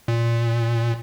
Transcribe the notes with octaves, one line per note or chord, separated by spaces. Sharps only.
A#2